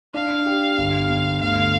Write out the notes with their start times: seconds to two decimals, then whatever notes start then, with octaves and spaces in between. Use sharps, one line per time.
0.14 D4 F5
0.46 G4
0.78 G1
1.10 G1
1.41 D2 F5